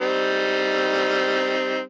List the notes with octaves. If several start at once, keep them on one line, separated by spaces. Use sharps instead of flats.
G3 C4 D#4